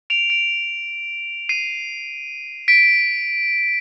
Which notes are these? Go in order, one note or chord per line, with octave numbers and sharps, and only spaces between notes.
D7 F7
D7 F7
C7 D#7
B6 D7